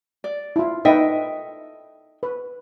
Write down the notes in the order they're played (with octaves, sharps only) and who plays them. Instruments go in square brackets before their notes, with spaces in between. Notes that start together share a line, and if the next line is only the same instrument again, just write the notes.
[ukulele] D5
[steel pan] E4 F4
[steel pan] D#4 B4 [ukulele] A4 E5 G5 [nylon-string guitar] D#5
[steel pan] B4